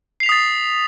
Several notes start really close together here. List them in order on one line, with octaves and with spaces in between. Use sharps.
C7 F7 B6 D#6 A6